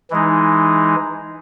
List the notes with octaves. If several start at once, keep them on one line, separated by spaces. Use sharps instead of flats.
E3 G#3 D#4